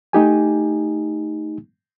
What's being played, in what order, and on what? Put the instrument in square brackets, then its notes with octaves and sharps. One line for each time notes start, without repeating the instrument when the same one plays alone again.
[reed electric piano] A3 D#4 G4 G#5